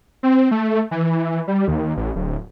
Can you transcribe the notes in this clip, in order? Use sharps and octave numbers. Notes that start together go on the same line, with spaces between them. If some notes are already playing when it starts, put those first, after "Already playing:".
C4
A3
E3
G3
D#2
A1
D1